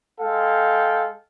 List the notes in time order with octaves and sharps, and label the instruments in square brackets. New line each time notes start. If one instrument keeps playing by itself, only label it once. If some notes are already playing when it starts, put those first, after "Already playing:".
[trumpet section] G#3 A4 F5 G5